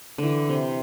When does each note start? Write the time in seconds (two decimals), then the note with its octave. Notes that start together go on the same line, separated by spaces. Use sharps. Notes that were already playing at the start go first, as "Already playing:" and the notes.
0.18 D3 E3
0.49 C3